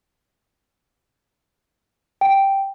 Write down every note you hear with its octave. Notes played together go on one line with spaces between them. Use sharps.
G5